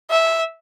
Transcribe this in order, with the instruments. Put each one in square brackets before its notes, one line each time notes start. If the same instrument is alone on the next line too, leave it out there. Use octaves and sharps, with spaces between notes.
[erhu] E5